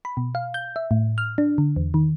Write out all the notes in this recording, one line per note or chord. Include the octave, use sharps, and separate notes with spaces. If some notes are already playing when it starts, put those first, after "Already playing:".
B5
B2
F5
G6
E5
A2
F6
D4
D3
E2
D#3